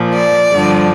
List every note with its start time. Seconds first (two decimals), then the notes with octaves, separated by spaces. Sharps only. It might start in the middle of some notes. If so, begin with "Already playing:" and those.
Already playing: A#2 F3
0.14 D5
0.50 G2 D3 F3